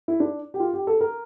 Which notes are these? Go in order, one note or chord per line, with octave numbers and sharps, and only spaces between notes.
E4
D4
G4
F4
G4
A4
A#4